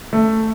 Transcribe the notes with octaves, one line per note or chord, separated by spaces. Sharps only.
A3